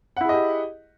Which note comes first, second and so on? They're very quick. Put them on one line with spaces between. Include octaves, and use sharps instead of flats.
F#5 E4 G#4 D#5 G4